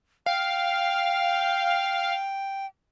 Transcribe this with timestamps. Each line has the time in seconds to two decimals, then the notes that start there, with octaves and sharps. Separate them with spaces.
0.26 F5 G5